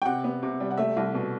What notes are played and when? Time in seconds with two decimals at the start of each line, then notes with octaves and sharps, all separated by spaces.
0.02 G5
0.05 C3 F#5
0.24 B3
0.43 C3
0.60 G3
0.71 F#5
0.78 A3 E5
0.97 C2
1.15 B2